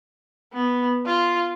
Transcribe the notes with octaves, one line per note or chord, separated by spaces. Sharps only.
B3
F4